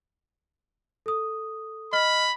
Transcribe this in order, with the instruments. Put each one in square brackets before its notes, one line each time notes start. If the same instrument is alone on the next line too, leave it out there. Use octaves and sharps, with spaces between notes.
[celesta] A4 D#6
[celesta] D#5 F6 [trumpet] B5